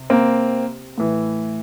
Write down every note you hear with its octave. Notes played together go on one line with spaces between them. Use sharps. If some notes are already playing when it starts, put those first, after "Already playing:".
Already playing: C3
A#3 C4
A2 E3